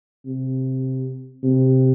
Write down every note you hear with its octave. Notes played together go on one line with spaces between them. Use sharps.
C3
C3